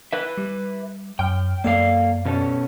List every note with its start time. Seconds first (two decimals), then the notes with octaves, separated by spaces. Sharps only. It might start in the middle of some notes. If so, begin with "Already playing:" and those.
0.13 B4 E5
0.37 G3
1.19 F#2 G5 F6
1.64 F#2 A#3 A4 D5 F5
2.25 B2 C#4 A4